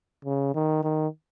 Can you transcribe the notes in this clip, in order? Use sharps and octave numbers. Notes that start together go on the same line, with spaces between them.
C#3
D#3
D#3